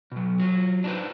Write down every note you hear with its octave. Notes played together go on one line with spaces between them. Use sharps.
B2 F#3
F#3 F4
D4 D#4 F#4 G#4 B4 C5